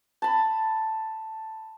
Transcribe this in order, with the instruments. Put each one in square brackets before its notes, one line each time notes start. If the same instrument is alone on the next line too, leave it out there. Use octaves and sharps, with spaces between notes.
[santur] A5 B5